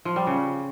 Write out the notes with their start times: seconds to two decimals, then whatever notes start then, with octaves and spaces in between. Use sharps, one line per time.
0.05 F3
0.16 G3
0.27 C#3